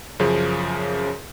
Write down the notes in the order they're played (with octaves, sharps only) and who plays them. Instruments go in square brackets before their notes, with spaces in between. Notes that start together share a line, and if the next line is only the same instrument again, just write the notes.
[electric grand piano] F#2 C#3 F3 G#4